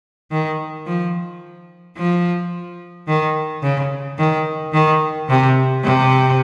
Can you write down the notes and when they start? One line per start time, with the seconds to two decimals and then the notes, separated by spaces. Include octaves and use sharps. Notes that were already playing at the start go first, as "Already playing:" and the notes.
0.31 D#3
0.86 F3
1.97 F3
3.07 D#3
3.63 C#3
4.18 D#3
4.73 D#3
5.29 C3
5.84 C3